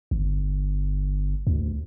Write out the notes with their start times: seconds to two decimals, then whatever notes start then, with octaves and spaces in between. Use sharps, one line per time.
0.11 G1
1.47 D2